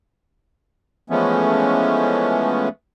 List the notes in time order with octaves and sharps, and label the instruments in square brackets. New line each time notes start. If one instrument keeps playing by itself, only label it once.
[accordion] E3 F3 G#3 A3 B3 C#4